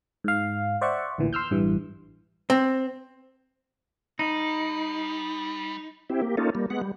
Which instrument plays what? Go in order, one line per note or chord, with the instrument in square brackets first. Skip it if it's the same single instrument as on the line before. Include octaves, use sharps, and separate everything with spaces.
[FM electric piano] G#2 F5
C5 D5 E5 F#5 C#6
A1 D2 A#2 E3
C6 E6 F6 G6
A1 G2 E3
[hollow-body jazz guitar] C4
[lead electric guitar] G3 [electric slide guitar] D#4
[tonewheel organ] C4 E4 G4
A#3 G4
A#3 C#4 D#4 F4 A4
G3 A#3
G#3 B3 F#5
G3